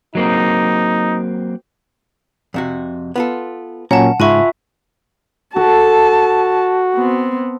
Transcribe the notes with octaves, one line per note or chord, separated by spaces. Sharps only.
F#3 A#3 C4 D#4
F2 C3 F#4
B3 F4 A4
A#2 F#3 C#4 F#5 A5 A#5
G#2 C#3 F4 E5 G#5 B5 C#6
F#4 A4 A5
B3 C4